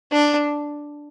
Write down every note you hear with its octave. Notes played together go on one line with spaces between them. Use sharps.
D4